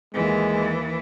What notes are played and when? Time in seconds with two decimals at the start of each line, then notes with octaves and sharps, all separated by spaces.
0.15 D#2 E3 G#3